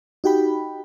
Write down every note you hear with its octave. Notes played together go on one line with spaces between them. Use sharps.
D#4 F#4 G4 G5 B5